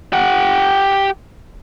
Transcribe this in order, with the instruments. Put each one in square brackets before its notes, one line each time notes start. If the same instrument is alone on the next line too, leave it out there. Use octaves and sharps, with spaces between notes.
[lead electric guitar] G4 F#5